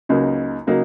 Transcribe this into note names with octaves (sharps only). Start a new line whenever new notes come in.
C#2 C#3 F#3 A#3 D#4
C#3 F#3 A#3 D#4